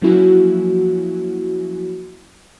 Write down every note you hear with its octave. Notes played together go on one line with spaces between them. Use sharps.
F3 F#3 A#3 C#4 E4 F#4